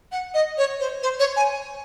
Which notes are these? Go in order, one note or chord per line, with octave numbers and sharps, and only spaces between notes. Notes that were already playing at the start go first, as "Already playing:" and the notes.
F#5
D#5
C#5
C5
C5
C#5
G#5